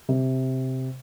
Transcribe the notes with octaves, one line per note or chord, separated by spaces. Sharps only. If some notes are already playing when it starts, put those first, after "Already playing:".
C3